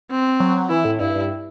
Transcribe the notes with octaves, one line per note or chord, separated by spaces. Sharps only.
C4
F#3
E3 E4
A2
G2 E4
G2